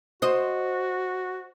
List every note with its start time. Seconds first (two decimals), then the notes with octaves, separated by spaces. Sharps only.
0.22 F#4 C5 D#5